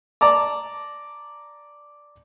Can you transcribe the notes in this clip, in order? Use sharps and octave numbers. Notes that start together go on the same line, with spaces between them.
D5 A5 A#5 D6